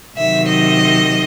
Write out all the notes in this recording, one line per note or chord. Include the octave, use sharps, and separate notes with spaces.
C3 D#3 F#3 E5
D#5